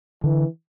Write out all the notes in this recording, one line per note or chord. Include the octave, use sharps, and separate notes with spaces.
D3 E3